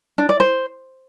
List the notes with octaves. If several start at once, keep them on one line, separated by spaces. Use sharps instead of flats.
D4
D5
C5